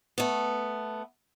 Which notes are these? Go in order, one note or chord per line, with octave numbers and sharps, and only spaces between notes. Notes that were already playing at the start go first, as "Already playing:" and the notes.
A3 B3